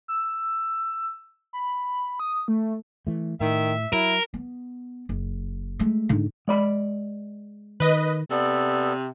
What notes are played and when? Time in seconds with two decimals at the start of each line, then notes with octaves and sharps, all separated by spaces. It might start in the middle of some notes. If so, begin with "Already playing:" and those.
0.08 E6
1.53 B5
2.20 D#6
2.48 A3
3.07 E3 A3
3.40 A2 D#3 E5
3.93 F#3 E4 A#4
4.34 B3
5.09 F#1
5.79 G#3 A3
6.09 G#2 D3
6.48 G#3 D5 B5
7.80 D#3 B4 D#5
8.30 C3 B3 A4 D5